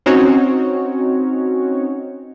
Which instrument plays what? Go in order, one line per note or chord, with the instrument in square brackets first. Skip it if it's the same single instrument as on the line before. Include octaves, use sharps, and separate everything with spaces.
[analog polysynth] C4 C#4 D#4 F#4 C#5